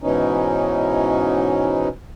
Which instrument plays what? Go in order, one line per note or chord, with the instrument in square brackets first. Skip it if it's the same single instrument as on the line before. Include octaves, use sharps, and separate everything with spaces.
[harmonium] G#2 B2 E3 C#4 D#4